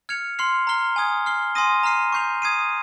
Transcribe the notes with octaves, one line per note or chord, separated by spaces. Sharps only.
F6 G#6 C#7 F7
C6 F6 C7 F7
A#5 F6 C7 G7
G#5 D#6 G#6
F6 C7 G7
G#5 C6 D#6 A#6 D#7
A#5 F6 C7 D#7
C#6 G6 C7 F7
D#6 G#6 C7 D#7